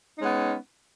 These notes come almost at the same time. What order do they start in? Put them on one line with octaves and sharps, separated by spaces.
D#4 C#4 G#3 B3